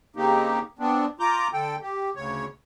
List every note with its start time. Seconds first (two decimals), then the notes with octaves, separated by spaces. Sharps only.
0.16 C#3 A#3 C4 D#4 G4
0.79 B3 C4 D4
1.20 F4 A#5 D6 G6
1.53 D3 A4 G5
1.81 G4
2.15 D2 C#3 C#5